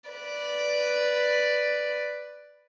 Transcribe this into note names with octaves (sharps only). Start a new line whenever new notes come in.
B4 D5